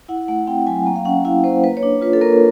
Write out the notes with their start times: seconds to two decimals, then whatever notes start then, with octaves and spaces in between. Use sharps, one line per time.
0.08 E4 F#5
0.28 A3 F#5
0.47 C4 G5
0.67 F#3 G#5
0.86 A#3 G5
0.96 F5
1.05 C#4 F#5
1.25 E4 F5
1.44 A#3 C5
1.63 A#3 B4
1.77 C#5
1.83 D4
2.01 F4 B4
2.13 A4
2.21 A#3 A#4